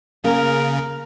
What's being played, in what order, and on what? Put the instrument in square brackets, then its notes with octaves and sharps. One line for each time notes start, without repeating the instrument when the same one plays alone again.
[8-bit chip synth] C#3 [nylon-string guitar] A#3 [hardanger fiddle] A#4